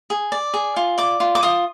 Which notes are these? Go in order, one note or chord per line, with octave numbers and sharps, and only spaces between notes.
G#4
D5
G#4
F4
D5 D6
F4
D6
F4 D#6